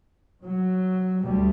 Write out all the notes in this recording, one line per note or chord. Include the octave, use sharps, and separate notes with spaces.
F#3
D2 G3